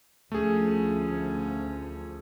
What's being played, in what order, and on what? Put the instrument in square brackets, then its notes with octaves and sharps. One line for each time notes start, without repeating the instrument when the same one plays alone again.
[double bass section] D2 F3 [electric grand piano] A3 G#4 [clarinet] C#4